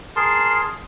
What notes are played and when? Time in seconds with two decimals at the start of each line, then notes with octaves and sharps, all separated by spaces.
0.16 G#4 A#4 A5 C6